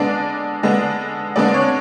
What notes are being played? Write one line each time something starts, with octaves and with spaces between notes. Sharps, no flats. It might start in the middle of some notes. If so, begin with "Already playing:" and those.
Already playing: D3 G#3 B3 D4 D5
D3 G#3 B3 D4
D3 G#3 B3 D4 D5
C#5